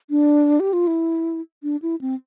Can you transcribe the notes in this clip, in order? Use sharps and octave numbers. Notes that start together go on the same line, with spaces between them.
D4
G4
F4
E4
D4
E4
C4